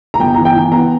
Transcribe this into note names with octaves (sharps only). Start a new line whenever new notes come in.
A#5
G1 G5
E3 A#5
G5
E3
B3 A#5